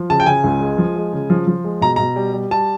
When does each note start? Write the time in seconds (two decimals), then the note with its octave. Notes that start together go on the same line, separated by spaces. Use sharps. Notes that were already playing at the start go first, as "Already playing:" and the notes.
Already playing: F3
0.10 C#3 A5
0.20 G5
0.26 C#3 G#5
0.44 C#2
0.60 G#3
0.78 F3
0.96 G#3
1.13 C#3
1.30 F3
1.47 F3
1.64 G#3
1.81 B2 A#5
1.96 B2 A#5
2.16 G3
2.33 G3
2.51 G3 A5